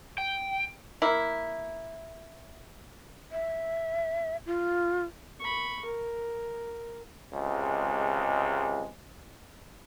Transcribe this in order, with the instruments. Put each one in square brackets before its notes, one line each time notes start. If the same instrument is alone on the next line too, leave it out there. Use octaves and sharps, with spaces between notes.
[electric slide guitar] G5
[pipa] A#3 E4
[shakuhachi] E5
F4
[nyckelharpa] B5 C#6
A#4
[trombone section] C#2 C3 G#3